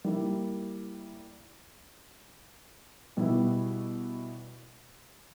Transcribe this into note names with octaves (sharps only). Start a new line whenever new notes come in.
G3 A#3 E4
B2 G3 B3 E4